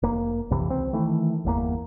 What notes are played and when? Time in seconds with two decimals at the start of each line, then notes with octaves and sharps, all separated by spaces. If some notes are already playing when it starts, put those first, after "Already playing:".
0.02 F1 A#3
0.50 A#1 F2 C3 E3
0.69 C#2 C4
0.93 D#3 E3 A3
1.45 G1 E2 C3 A#3